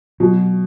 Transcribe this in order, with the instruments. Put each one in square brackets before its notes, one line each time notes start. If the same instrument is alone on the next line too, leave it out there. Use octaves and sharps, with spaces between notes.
[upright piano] B2 [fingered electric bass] F#3